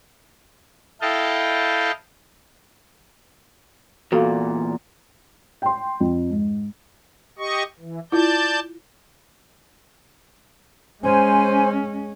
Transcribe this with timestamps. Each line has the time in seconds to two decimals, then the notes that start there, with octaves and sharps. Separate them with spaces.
1.01 E4 A4 D#5 F5 G5 A5
4.12 E2 A#2 F#4 A4 F5
5.62 G5 C6
6.00 F2
6.30 G#2
7.39 G4 D#5 C#6
7.79 E3
8.12 E4 F4 D5 A5 G6
11.03 G#3 C#4 C5 G#5